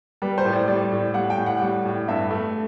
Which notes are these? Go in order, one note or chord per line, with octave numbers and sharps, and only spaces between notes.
G3 B4
C5
A2
D5
G3 D5
A2
G3 F#5
G5
A2
F#5
G3
A2
G2 E5
A3